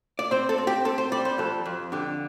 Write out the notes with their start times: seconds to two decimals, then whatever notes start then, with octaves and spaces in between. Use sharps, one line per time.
0.19 D5
0.31 C4 C5
0.49 A4
0.58 C4
0.67 G4
0.85 C4 A4
0.98 C5
1.12 G3 D5
1.25 C5
1.38 F2 A4
1.65 F2
1.92 D3 G4